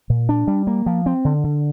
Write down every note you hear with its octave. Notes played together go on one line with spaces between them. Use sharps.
A#2
D4
G3
A#3
F3
C4
D3
D3